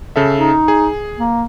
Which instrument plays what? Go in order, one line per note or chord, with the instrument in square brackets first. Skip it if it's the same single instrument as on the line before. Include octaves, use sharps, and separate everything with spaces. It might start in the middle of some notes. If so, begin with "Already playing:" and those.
[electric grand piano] C#3 A4 E5
[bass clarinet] D#4
[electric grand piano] G#4
[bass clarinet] A#3